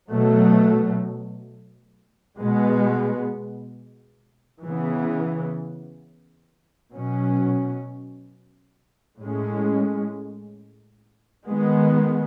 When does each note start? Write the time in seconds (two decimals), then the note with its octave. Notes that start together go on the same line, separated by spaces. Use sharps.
0.10 B2 F#3 A3
2.37 B2 G#3 B3
4.65 C#3 E3 B3
6.93 B2 F#3 C#4
9.20 A2 G#3 C#4
11.48 D#3 G#3 B3